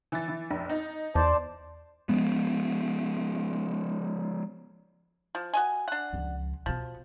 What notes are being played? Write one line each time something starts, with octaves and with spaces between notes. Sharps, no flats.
E3 A6
E3
F1 A#1
D#4
E2 C5 D5 A5
F3 G#3 B3
F3
F#4 D#5 G#5
D4 F#5
C#2 F3
B2 F3 B3